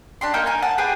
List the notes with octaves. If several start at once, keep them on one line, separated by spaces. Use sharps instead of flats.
D4 G4 C6
A#3 D#4 A#4 G5
G#5 A#5
F#5 A5
G4 G#4 B4 F#6